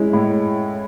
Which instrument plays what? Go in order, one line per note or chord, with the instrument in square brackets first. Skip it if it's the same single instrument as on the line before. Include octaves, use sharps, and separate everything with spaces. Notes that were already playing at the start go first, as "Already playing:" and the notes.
Already playing: [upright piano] G#3 C#4 E4
A2